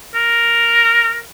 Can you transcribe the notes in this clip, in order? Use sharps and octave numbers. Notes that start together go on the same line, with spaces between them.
A#4